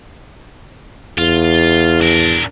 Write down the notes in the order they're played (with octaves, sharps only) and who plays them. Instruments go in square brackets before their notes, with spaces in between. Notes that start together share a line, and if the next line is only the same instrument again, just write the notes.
[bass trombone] E2 [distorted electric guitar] F4
[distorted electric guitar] D4 A#4